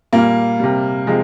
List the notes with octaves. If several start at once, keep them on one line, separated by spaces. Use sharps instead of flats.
A#2 G3 A#3
C3 G3
C3 F3 G#3